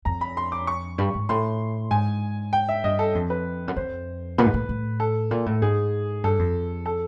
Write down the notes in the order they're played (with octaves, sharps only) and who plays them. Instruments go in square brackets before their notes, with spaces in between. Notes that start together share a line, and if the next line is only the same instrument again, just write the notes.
[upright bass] F2 [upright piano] A#5
[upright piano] B5
C6
D6
C#6
[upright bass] G2
G#2
[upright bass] A2 [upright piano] C6
[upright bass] G#2 [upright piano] G#5
[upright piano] G5
E5
[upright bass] G2 [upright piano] D#5
[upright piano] A4
[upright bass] F2
[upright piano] B4
[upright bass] F#2
[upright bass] F2 [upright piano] C5
[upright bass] A#2 [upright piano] B4
[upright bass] G#2
A2
A2
[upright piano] A4
[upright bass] A#2
A2
[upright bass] G#2 [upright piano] G#4
[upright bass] G2 [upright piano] A4
[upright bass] F2
[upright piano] A4